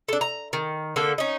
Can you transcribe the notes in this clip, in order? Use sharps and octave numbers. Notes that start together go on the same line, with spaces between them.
D4 A4
A#5
D#3
D3 A#3 A4
C#4 D#4